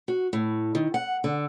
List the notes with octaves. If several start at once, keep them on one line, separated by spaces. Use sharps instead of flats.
F#4
A2
D#3
F#5
D3